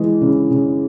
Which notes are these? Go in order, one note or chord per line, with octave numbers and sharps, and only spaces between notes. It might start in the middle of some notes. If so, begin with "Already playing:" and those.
Already playing: E3 G#3
C#3
C#3